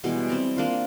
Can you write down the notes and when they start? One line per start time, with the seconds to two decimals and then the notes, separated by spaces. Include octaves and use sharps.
0.04 B2 E3 G3 G#3
0.29 C4 D5 A#5
0.57 A#3 D4 F4